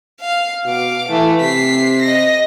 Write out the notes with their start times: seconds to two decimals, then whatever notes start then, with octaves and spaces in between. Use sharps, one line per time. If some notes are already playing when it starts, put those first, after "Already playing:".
0.21 F5
0.65 B2 F5 D6
1.09 E3 A3
1.40 C3 B6 C7
2.02 D#5 A#6